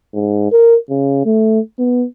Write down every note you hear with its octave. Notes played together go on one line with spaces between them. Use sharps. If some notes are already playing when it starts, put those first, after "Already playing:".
G#2
A#4
C#3
A3
B3